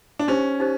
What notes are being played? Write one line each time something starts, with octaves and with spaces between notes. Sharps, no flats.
D4
C#4 D#4 G4 C5
D#4 G4 C5